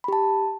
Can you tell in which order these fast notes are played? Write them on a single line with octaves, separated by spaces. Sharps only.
B5 G4 A5